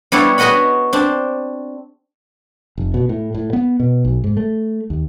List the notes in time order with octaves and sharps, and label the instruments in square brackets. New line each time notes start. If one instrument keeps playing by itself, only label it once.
[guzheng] G3 B3 D4 E4 C#5
F#4 G#4 B4 D#5 F#5 B5
C4 D4
[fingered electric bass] F1
B2
A2
A2
B3
B2
B1
G#2
A3
D#2